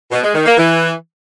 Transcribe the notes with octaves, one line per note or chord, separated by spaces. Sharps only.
B2
G#3
D#3
A#3
E3